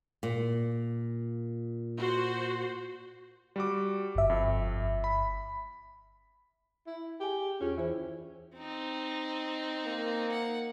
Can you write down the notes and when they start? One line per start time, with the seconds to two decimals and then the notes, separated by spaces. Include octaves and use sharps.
0.23 A#2
1.97 F#4 C5
3.56 G3 F#4 D6
4.15 G1 E5
4.30 F2
5.04 B5
6.87 E4
7.20 G4 G#4 G#5
7.61 E2 C#4 F4 G#4
7.77 E3 E4 C5
8.57 C4 D#4
9.85 A#3
10.32 F#5